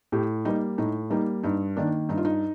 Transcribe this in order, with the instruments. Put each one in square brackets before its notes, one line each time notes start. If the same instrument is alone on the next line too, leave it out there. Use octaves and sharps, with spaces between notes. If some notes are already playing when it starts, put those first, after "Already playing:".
[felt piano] A2 G4
G3 A#3 D#4
A2 D#4
G3 A#3 D#4
G2 D#4
D#3 A#3 D4
G2 D#4
F4
D#4